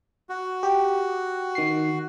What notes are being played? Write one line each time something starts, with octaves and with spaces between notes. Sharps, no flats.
F#4
G4
D#3 C7